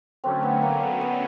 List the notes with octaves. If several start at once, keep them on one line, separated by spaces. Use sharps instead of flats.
D3 F#3 A3 C4 C#4
B3
A#3
B3
B3